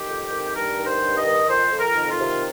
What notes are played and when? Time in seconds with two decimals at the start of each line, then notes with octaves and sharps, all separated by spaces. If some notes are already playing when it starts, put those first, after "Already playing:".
Already playing: D#3 G4
0.08 F2
0.31 D#3
0.55 G2 A#4
0.78 D#3
0.87 C5
1.01 G2
1.18 D#5
1.25 D#3
1.48 F2 C5
1.72 F2
1.80 A#4
1.95 D#3
2.11 F4
2.19 C3